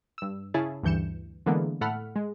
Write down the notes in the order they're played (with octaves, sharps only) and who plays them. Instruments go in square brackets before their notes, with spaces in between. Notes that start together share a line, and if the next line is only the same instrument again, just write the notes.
[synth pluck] G2 E6
C#3 C#4 E4 G#4 A5
D2 G2 E3 G6 C#7 E7
D3 E3 G#3 A#3 B3
A2 A3 A4 F#5 B5 F6
G#3